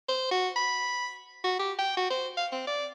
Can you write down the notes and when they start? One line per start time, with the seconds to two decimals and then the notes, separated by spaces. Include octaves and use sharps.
0.09 C5
0.31 F#4
0.56 B5
1.44 F#4
1.60 G4
1.79 G5
1.97 F#4
2.11 C5
2.37 F5
2.52 C4
2.67 D5